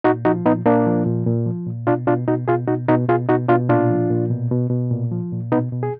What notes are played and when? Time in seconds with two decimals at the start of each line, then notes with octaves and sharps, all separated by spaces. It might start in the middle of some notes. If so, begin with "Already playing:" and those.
0.04 A#2 D#4 F#4
0.25 F3 D#4 F#4
0.46 A#2 B3 D#4
0.65 A#2 A#3 D4
0.86 F3
1.06 A#2
1.27 A#2
1.46 F3
1.67 A#2
1.87 B2 D4 F4
2.07 B2 D4 F4
2.28 B2 D#4 F#4
2.48 B2 F4 G#4
2.68 B2 D#4 F#4
2.88 B2 D#4 F#4
3.08 B2 F4 G#4
3.29 B2 D#4 F#4
3.49 B2 D4 F4
3.69 A#2 D4 F4
3.90 F3
4.10 A#2
4.30 B2
4.51 B2
4.70 B2
4.91 A#2
5.11 F3
5.32 A#2
5.52 B2 B3 D#4
5.72 B2
5.83 G#4